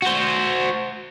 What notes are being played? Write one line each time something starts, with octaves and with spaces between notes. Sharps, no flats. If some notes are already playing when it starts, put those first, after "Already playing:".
F#4 C5